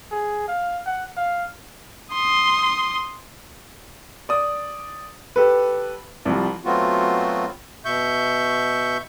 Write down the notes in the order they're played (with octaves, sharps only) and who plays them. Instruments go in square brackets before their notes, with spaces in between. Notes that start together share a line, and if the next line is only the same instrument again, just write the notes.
[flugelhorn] G#4
F5
F#5
F5
[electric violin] C6 D#6
[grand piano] D5 D#6
G4 A4 B4
C2 F3 G3
[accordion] F#3 A3 B3 C4 F4 F#4
B2 E5 C#6 G6